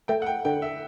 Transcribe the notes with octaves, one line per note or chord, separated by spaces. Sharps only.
A3 G5
F#5
G5
D3 G5
E5